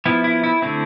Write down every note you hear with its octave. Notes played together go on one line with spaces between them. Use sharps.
F3 B3 E4
E4
E4
D3 A3 C4 E4